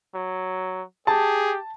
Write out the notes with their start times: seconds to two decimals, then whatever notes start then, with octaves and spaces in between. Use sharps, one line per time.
0.15 F#3
1.07 G4 G#4 A5